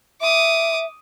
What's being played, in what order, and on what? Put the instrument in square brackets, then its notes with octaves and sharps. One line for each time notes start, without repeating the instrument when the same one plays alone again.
[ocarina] E5 [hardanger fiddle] D6 D#6